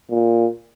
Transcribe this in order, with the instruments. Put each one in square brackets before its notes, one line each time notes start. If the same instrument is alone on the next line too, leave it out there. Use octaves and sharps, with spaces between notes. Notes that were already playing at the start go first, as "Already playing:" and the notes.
[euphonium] A#2